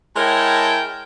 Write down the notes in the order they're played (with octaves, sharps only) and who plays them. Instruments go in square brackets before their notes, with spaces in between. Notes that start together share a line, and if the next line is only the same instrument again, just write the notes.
[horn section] G#3 E4 A#4 C#5 G5 A5